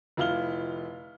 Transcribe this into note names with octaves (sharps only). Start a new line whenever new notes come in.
F1 E4 F4 F6 G7